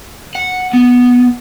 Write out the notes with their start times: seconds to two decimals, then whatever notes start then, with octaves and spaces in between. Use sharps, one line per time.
0.35 F#5
0.73 B3